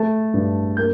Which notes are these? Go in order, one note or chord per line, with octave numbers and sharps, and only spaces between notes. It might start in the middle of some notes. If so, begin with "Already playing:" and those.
Already playing: A3 A5
G2
A#3 G6